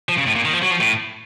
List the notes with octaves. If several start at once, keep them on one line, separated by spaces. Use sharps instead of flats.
F3
C#3
A2
A#2
D#3
F3
F#3
F3
A2